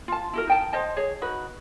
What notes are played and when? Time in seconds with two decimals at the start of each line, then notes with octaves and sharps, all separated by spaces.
0.08 F4 A5
0.33 E4 F#4 A#4
0.48 D#4 G5 A5
0.73 C5 D#5 A5
0.97 G#4 C#5
1.22 D#4 F#4 B4